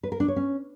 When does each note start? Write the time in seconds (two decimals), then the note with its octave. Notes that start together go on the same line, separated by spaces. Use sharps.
0.03 B4
0.12 A#4
0.20 D4
0.28 C#5
0.36 C#4